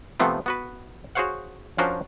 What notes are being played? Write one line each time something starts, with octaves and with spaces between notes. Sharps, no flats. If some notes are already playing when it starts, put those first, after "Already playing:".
C3 F3 A3 B3 C4
B3 F#4 B4
F#4 G#4 C5 C#5 F5 F#5
F3 C#4 D4 F#4 A#4 C5